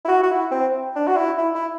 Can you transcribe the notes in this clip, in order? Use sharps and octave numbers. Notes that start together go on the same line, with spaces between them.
E4
F#4
F#4
E4
C4
D4
F#4
E4
E4
E4